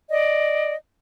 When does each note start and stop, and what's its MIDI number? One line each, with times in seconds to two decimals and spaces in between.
0.09 0.73 74
0.09 0.73 75